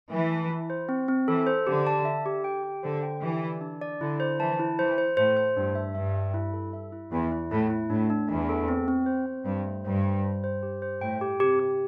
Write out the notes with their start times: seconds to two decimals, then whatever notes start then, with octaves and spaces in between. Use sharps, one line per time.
0.10 E3 A3
0.31 A5
0.50 E4
0.70 C5
0.89 C4
1.08 C4
1.28 E3 A4
1.47 C5
1.67 D3 G4
1.87 A5
2.05 E5
2.26 G4
2.44 G5
2.63 G4
2.83 D3 C5
3.03 G5
3.22 E3 G4
3.43 D5
3.61 D4
3.82 D5
4.00 D3 E4
4.20 C5
4.39 E3 A5
4.59 E4
4.79 E3 C5
4.98 C5
5.17 A2 C5
5.37 C5
5.57 G2 D4
5.75 E5
5.95 G2 E5
6.15 E5
6.34 E4
6.53 A4
6.73 E5
6.92 E4
7.12 E2 E4
7.32 E4
7.51 A2 E4
7.70 E4
7.90 A2 D4
8.10 D4
8.29 E2 D4
8.49 A4
8.68 C4
8.88 C4
9.06 C5
9.26 C4
9.45 G2 C5
9.65 A3
9.84 G2 C5
10.04 C5
10.24 C5
10.44 C5
10.63 G4
10.82 C5
11.01 A2 G5
11.21 G4
11.40 C3 G4
11.60 G4